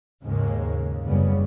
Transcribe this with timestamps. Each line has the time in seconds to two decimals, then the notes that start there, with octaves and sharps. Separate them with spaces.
0.23 D#2 G#2 C#3 G#3 A#3
0.72 C#3
1.05 F#1 C#3 G3 B3